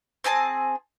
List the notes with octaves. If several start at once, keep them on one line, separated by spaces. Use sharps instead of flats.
C4 G#4 G#5 A5